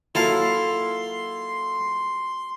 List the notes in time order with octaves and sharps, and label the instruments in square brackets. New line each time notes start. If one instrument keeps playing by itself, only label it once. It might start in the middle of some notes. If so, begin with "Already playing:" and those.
[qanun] F#3 A#3 F4 [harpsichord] E4 A4 F5 [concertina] C6